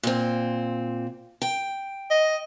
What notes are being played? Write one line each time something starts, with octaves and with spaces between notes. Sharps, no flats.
A#2 C4
G5
D#5